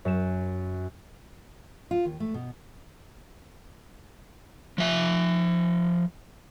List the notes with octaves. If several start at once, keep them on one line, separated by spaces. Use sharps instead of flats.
F#2 E7
F4
D#2
A3
B2
F3 E5